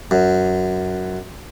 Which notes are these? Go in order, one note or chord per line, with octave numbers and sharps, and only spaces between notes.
F#2